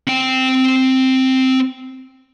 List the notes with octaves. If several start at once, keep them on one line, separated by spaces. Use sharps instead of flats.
C4 G5